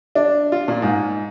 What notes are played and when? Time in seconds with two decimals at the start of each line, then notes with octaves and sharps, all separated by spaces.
0.15 D4
0.52 F4
0.68 A#2
0.82 G#2